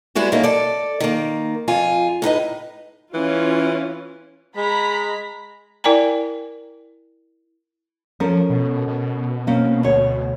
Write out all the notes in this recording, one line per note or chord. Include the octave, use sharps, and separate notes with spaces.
G3 G#3 B3 E4 F#4
F#2 D#3 A#3 D#4
A4 D5
D#3 A#3
F2 F4 G#5
A2 D#4 B4 D#5
E3 C#4 F4
G#3 A#5 B5 B6
E4 A#4 D5 G5 G#5 A#5
F3 C#4 A4 A#4
B2
B2
A#3 C4 C#4
D2 C#5